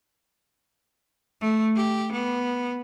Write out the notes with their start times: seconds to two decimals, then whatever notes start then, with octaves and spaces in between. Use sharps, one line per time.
1.41 A3
1.76 G4
2.13 B3